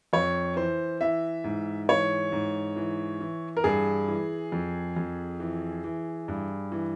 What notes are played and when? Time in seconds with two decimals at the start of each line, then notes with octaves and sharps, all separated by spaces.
0.13 F2 C#5
0.56 E3 C5
1.01 E3 E5
1.44 G#2
1.89 E3 C#5
2.32 G#2
2.76 E3
3.20 E3
3.57 A#4
3.64 G2 G#4
4.08 E3
4.52 F2
4.96 F2
5.40 E3
5.84 E3
6.28 G2
6.72 E3